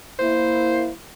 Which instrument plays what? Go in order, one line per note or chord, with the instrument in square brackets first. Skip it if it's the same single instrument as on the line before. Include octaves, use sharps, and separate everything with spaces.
[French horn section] A#3 E4 [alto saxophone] C5